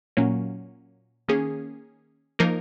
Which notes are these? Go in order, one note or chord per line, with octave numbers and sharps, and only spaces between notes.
A#2 F#3 A#3 C#4
D#3 A#3 C#4 G#4
F3 A#3 D#4 A#4